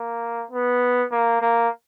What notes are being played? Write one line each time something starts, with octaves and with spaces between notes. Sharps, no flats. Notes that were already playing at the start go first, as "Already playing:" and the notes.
Already playing: A#3
B3
A#3
A#3